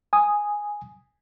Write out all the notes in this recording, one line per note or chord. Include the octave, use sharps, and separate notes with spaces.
G#5 D#6